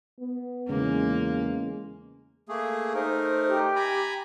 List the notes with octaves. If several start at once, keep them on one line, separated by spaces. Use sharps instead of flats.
B3
E2 C#3 G#3 A#3 C#4
A3 A#3 G#4
A3 D#4 A#4 C5
G4
G#5 A#5 B5